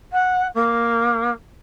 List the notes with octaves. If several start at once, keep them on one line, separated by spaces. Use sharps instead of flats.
F#5
A#3